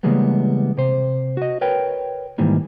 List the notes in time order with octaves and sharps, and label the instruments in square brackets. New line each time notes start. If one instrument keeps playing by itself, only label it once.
[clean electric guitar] C#3 E3 G3 G#3 A#3 B3
C3 C5
F#4 D#5
A#4 B4 C#5 G5
G#2 D#3 E3 G3 A#3